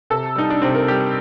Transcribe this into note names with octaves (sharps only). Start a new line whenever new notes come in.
C3 A4
G3 D#4
D4
C3 C4
A#4
G3 G4